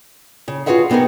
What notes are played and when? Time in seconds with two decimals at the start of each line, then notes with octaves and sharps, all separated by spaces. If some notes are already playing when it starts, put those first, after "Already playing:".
0.48 C#3
0.66 F4 F#4 G#4 B4 E5 F#5
0.90 C3 B3 D#4 G#4 A#4